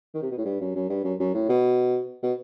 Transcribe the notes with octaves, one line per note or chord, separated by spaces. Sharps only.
D#3
C3
B2
A2
G2
F#2
F#2
G2
F#2
F#2
A2
B2
B2